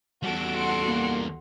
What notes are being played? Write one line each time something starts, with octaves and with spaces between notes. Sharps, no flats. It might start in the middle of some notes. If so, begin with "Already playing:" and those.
E2 G3 F#4 A4 D7
F#5 C6
A#3